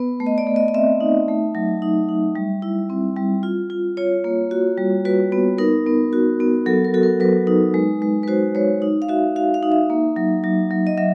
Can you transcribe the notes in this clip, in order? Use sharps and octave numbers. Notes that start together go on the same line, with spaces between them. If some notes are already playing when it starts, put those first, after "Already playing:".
Already playing: B3 B4
A3
D#5
D5
A3
D#5
D#5
C4 E5
D#4
A3
F#3
D#4
D#4
G3
E4
C4
G3
F4
F4
F4 C#5
A#3
F#4
G3
F#4 B4
B3
D#4 A#4
B3
F#4
B3
F#3 A4
A#4
F#4 A4
A#4
F#3 B4
D#4
G#3
G#3
B4
F#4 C5
G#3 C#5
D#4
F5
F#4 E5
F#4 F5
F5
D#4
E5
A#3
F#3
F#3
F#3
D#5
F#3 E5